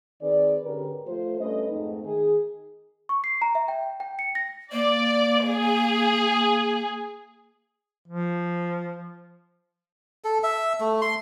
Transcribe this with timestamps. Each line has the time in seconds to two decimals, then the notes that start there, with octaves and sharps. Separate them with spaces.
0.22 D#3 C4 G#4 B4 D5
0.65 G#2 D3 C#4 G4 A#4 B4
1.07 F3 A3 F4 C5
1.40 G2 A3 C#4 B4 D#5
1.70 F2 G#2 A3 C4 D#4
2.04 D#3 G#4
3.09 C#6
3.24 C7
3.42 A#5
3.55 E5
3.68 G5
4.00 G5
4.19 C#7
4.35 A#6
4.72 A#3 D5
5.45 G#4
8.08 F3
10.24 A4
10.43 E5
10.80 A3
11.02 C6